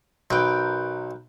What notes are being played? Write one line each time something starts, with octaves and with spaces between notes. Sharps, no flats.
B1 A#4 B4 G5